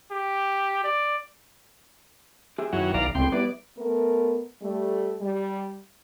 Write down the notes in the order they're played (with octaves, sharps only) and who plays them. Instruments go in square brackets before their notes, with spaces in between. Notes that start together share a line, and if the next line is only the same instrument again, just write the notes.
[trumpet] G4
D5
[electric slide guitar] G4 G#4 E5
[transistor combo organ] F#2 F#3 [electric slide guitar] D#3 E4
[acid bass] B1 [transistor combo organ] D5 F5 A#5
[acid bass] C#2 [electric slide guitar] A2 C3 [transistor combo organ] G5 C6
[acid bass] G3 [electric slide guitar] B3 E4 [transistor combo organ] D5
[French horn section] A3 B3 A#4
G3 A3
G3